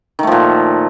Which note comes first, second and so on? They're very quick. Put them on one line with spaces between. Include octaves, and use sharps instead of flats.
D#3 A3 F3 A#2